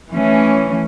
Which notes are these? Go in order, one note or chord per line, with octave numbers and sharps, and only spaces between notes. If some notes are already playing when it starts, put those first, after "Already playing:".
E3 A3 C#4